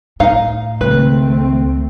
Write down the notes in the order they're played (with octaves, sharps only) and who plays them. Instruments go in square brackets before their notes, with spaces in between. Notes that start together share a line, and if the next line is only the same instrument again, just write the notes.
[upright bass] A2 [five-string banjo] D#4 F5
[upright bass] C#2 [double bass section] D#3 A3 C4 [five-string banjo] B4